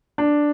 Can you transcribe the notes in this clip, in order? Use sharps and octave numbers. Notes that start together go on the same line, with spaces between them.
D4